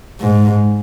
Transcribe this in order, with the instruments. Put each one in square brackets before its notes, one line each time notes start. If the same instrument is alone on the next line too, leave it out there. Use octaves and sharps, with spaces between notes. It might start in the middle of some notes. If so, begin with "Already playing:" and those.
[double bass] G#2